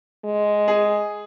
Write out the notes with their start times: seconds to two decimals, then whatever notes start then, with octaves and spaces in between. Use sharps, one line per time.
0.24 G#3
0.68 G#4